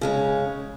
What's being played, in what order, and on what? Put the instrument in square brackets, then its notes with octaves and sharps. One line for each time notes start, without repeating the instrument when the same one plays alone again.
[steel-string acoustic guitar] C#3 G#3 C#4